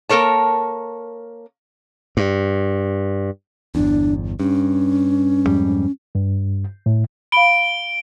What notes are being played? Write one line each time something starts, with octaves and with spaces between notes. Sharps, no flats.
A#3 A4 A#4 C#5 A5
G2
G1 E2 D4
G2 C#4
F2 G#2 G3
G2
A2
F5 B5 D7 G7